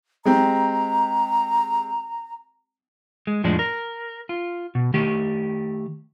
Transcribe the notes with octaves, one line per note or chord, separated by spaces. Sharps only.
G#3 C4 G4 A#5
G#3
F2 A2 F3 G#3 D4
A#4
F4
B2
D#3 A3 G4